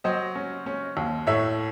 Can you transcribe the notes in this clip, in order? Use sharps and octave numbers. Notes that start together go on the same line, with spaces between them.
F#3 C5 D#5
C#4
C#4
D#2
A2 C#5 E5